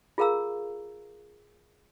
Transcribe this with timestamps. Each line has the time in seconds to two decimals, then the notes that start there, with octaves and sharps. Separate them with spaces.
0.18 F4 G#4 A#4 F5 A#5 E6